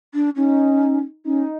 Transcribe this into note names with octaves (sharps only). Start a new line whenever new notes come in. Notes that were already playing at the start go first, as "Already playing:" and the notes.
D4
C#4 D#4
C#4 D#4